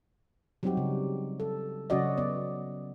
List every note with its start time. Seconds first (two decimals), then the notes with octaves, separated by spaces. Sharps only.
0.63 F#3 G3 C4 D#4 F#4 G4
0.77 C#3
1.40 A4
1.90 C#3 F#3 C#4 F#4 D5 D#5
2.17 B3 D5